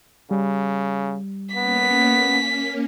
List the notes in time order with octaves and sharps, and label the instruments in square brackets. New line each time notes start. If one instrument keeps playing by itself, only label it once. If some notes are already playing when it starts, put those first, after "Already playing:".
[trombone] C#3 [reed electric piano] G3
[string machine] A#3 C#4 [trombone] B3 [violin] B6